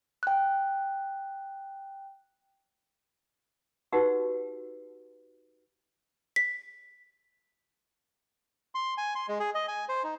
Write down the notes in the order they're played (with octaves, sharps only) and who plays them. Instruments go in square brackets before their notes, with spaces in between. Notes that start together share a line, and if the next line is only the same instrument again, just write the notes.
[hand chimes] G5 F#6
[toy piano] D#4 F#4 G4 B4 F#5 E6
[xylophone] B6
[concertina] C6
G#5
C6
G#3
G#4
D#5
G#5
C5
D#4